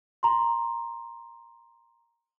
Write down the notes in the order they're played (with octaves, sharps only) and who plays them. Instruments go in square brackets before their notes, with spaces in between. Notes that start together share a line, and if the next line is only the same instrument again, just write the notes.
[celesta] A#5 C6